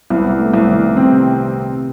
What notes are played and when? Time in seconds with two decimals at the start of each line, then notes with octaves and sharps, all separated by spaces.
0.10 C2 B3
0.39 A3
0.54 C2
0.68 D#3
0.96 C3 C4